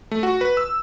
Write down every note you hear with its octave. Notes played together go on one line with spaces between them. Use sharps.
A3
F#4
B4
E6